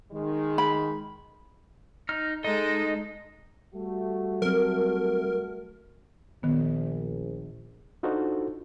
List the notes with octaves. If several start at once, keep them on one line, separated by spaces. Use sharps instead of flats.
D#3 G#3
B5
D#4 F6
G#3 D#4 A4 D#5
G3 A3 F#4
F#3 C4 A#4
A#1 D#3 B3
D4 D#4 F4 F#4 A4 C5